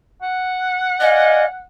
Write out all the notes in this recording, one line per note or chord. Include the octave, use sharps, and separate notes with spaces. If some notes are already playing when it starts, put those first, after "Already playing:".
F#5
D5 D#5 F5 G#5